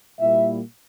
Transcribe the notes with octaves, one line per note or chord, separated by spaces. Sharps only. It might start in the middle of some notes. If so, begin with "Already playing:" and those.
A#2 G3 A#3 E4 E5